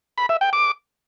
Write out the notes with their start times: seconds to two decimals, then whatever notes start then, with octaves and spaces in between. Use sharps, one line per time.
0.18 B5
0.29 E5
0.41 G5
0.53 D6